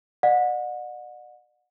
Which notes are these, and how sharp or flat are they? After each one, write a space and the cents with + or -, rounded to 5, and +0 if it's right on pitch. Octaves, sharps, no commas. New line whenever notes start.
D5 +45 F#5 -30